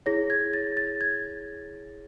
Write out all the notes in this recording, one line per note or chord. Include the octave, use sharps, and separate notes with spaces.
E4 G#4 C#5 A#6
G#6
A6
A6
G#6